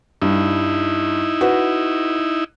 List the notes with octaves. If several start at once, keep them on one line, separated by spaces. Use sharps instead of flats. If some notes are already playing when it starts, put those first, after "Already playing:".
G2 D#4 E4
F#4 B4